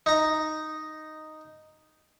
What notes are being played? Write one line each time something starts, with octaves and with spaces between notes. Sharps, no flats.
D#4 A#5